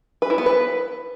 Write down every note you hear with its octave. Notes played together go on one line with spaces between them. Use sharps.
B4
E4
B3
B4